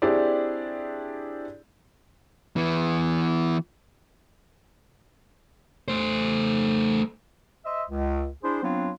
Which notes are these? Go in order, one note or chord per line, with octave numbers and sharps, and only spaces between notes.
C4 D4 E4 G4 G#4 D5
E3 B3
A3 C5
C5 D#5 E5
C#2
D4 E4 G#4 C5
F#3 B3 C4 D4 F4